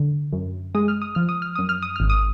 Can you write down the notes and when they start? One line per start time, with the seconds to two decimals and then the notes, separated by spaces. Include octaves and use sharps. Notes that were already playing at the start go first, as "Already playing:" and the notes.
Already playing: D3
0.33 F#2
0.75 G#3 D#6
0.88 F6
1.02 D#6
1.15 F3 F6
1.29 D#6
1.42 F6
1.55 F#2 D#6
1.69 F6
1.82 D#6
1.96 G#1 F6
2.09 D#6